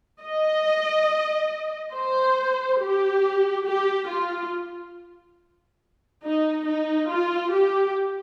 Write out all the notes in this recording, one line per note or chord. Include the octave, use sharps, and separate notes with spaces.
D#5
C5
G4
G4
F4
D#4
D#4
F4
G4